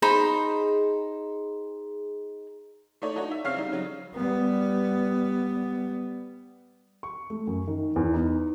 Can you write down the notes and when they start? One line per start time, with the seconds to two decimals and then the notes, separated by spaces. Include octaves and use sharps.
0.02 D#4 G#4 C5 B5
3.02 A3 D#4 C#5 D5
3.15 D4 D#4 F#4 C#5
3.31 E5
3.44 C#3 C4 C#5 F5 F6 C7
3.56 G3 D#4
3.72 C#3 F#3
4.15 G3 B3
7.03 C#6
7.30 A3
7.47 F#2
7.67 D#3
7.96 E2
8.14 D#4